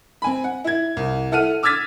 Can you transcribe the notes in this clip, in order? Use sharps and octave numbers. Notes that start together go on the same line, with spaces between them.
C4 G#5 B5
F#5
E4 G#6
C2
E4 A4 F#5 F6 D#7
D6 E6 F6 G#6 A6 B6